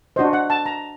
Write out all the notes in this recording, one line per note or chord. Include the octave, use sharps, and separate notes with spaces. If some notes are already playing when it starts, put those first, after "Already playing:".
D4 F#4 C5 D#5
F#5
A5
A#5